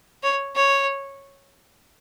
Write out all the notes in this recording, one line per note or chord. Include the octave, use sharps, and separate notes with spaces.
C#5
C#5